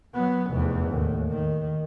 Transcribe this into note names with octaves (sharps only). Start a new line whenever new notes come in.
F#3 B3
F1 E2
D#2 A2
D#3